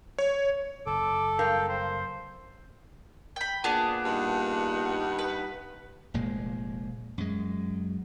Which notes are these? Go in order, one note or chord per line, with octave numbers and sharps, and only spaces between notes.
C#5
F#1 A4 D6
G2 A#4 F5 G5
C5
G5 B5
A#2 B3 D4 G#4
G2 D#4 F#5
B4
F1 A#2 G#3
F#2 G#3